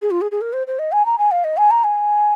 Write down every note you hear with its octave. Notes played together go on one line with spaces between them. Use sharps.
G#4
F4
G#4
G#4
A#4
C5
C5
D#5
G#5
A#5
G#5
F5
D#5
G#5
A#5
G#5